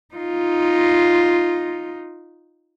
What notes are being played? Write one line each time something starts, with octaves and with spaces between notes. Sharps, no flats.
D#4 F4